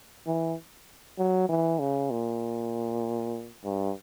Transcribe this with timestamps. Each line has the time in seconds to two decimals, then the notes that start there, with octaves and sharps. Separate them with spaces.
0.26 E3
1.18 F#3
1.49 E3
1.80 C#3
2.11 A#2
3.64 G2